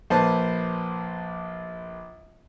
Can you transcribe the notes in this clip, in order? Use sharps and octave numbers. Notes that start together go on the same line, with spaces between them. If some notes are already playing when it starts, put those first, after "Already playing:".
A#1 A#3 B4 C5 A5